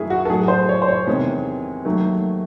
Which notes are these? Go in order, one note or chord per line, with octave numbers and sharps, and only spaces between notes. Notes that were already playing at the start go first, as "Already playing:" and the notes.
Already playing: F#2 D#3 A3 E4 G#4
F#4
A4
A2 F#3 A3 G#4
C5
C#5
C5
C#5
E2 C3 D#3 G#3
D#2 D#3 F#3 A3